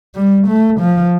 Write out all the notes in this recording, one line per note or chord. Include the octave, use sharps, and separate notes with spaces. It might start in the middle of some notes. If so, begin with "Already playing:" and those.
G3
A3
F3